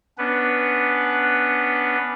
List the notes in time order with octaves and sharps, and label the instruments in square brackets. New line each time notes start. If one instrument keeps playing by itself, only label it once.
[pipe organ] B3 C#4 D4 B4